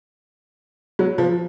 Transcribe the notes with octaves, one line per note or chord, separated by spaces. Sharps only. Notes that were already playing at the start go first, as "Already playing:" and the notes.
F#3
F3